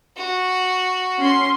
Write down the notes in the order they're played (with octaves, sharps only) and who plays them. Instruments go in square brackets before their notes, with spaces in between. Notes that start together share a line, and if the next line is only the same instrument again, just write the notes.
[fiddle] F#4
[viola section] C#4 C6